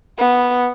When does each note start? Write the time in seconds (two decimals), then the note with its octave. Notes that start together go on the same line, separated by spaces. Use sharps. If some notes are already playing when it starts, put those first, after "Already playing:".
0.18 B3